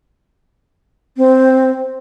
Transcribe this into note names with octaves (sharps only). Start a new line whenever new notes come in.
C4